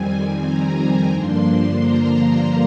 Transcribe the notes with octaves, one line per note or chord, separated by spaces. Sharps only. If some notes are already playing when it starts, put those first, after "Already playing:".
Already playing: F2 D#3 G3 C4 G#5
A#5
G2 D3 F3 A#3 D4 C6
A#5